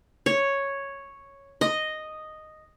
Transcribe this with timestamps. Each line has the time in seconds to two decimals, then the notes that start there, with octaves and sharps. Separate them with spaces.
0.26 C#5
1.61 D#5